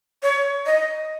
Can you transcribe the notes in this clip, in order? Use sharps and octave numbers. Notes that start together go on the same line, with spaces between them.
C#5
D#5